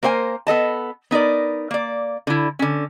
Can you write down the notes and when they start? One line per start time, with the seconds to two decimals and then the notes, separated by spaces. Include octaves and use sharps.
0.03 A#3 A#4 C5 F#5 G#5
0.47 B3 A4 D#5 A5
1.11 B3 D#4 A#4 D5
1.71 A#3 D5
2.27 D3 E4
2.59 D3 C#4